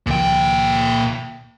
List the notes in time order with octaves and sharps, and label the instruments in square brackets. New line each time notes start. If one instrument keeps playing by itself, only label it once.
[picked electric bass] C#2 D#3 F3 [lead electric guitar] A#2 G5